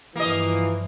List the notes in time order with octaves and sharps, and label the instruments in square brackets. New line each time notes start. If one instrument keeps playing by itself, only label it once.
[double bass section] G2 F3 [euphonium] E3 [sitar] A#3 D#5